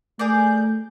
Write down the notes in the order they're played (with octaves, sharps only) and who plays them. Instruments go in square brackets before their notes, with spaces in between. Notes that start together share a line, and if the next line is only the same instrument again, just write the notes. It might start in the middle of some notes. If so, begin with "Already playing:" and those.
[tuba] A3 [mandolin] G#4 A#4 D5 [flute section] G6